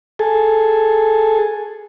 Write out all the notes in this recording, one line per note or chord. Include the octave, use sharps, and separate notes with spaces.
G#4 A4